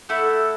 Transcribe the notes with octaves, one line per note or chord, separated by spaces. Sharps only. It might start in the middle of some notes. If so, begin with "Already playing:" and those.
A3 E4 A4 F#5